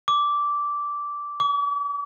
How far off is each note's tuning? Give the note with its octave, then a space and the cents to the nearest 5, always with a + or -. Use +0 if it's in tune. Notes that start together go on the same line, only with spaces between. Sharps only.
D6 -10
D6 -45